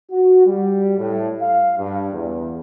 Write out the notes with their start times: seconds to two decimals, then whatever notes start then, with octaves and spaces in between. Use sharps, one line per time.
0.11 F#4
0.46 G3
0.98 A2
1.40 F5
1.77 G2
2.13 E2